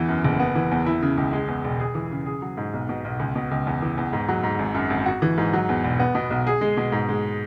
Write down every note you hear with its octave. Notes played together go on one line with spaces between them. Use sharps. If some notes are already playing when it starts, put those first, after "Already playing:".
Already playing: E2 E3
F#2
F#1
B3
E3
E2
E4
C#3
C#2
G#3
E2
E1
G#4
E3
C#3
G#4
F#3
G#2
B1
B2
B1
C#2
B2
C#2
E2
E3
E2
G#2
F#3
G#2
G#1
F#2
G#1
F#4
E3
G#2
F#3
E2
E1
B3
B2
B1
G#4
G#3
B2
G#2
G#3